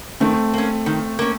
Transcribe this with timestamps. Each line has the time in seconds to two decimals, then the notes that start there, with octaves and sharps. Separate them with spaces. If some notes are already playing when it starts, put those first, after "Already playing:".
0.20 D#3 A3 C4
0.53 A#3 C#4
0.86 D#3
1.19 A#3 C#4